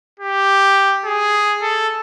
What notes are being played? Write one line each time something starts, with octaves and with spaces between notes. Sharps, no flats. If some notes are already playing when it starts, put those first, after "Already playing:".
G4
G#4
A4